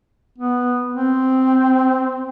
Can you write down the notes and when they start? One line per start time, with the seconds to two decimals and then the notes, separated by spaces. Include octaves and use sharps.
0.38 B3
0.93 C4